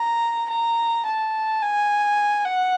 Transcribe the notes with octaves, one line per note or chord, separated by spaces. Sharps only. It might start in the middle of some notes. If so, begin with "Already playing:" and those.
Already playing: A#5
A#5
A5
G#5
F#5